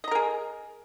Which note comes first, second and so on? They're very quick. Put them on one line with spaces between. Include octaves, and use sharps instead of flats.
D#5 A#5 A#4 G#4